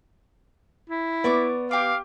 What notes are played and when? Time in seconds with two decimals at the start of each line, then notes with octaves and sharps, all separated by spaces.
0.90 E4
1.24 B3 D5 C#6 D6
1.71 G4 F5 D6